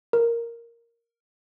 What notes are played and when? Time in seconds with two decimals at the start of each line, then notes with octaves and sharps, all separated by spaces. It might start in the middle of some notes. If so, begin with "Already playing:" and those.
0.13 A#4